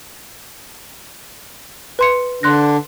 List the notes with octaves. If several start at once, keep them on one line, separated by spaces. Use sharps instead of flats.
B4 C6 C#7
D3 D4 C6 F#6 A#6